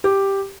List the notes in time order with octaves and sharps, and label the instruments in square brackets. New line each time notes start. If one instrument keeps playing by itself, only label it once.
[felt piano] G4